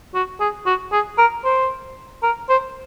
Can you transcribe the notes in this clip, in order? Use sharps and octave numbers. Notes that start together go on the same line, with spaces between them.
F#4
G#4
F#4
G#4
A#4
C5
A#4
C5